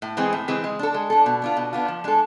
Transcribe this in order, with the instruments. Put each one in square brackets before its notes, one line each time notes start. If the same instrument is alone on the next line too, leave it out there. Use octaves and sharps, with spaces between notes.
[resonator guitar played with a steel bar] A2
E3 G#3 C4 G#4
A2
E3 G#3 C4 G#4
G#3
D4 A4
G#3
D4 A4
B2
B3 D4 F4
B2
B3 D4 F4
F3
G#3 D4 A4